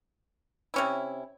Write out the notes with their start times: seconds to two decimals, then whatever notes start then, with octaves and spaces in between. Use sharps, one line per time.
0.74 C3 C#4 E4